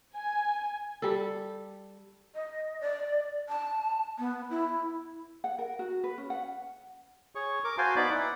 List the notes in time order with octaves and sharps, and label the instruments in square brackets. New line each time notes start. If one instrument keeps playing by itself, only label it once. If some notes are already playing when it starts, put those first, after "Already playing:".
[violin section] G#5
[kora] G3 A4
[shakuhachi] D#5
D5
A5
B3
E4
[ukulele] F#5
A#4
F#4
B4
C#4
F#5
[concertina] G#4 C#5 C#6
A#4 D6
F#4 C5 F5 G#5 A5 C6
B3 D#4 D5 B5 D6
E4 F#5